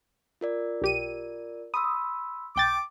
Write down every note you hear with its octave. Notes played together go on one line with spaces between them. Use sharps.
F4 A#4 D5
B1 G4 D#7
B5 C6 D#6 E6
B1 G5 D6 A6